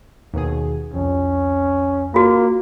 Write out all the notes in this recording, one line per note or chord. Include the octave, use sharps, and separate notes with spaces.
D#2 B2 G#4
C2 F2 C#4
A#3 F4 F#4